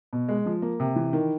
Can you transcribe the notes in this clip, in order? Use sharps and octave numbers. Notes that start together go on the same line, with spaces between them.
B2
G#3
F3
A#3
C3
E3
D#3